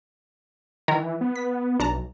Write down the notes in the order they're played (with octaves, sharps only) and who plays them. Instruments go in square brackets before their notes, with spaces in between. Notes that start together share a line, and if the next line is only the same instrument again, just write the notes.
[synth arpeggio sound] D#3 A#4 [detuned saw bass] E3
[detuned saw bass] B3
[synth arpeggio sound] B6
[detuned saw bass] B1 [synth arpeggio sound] D4 A5 A#5